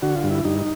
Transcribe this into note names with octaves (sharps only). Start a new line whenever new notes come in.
D3 F#4
F4
G2
E4
G2 D#4